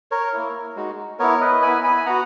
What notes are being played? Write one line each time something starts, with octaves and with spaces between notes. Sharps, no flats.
A#4 C#5
A#3 E4
G#3 D#4 F#4
B3 E4 A#4 C#5
B4 D#5
B3 E4 G#5 B5
G#5 B5
B3 F#4 F#5 A#5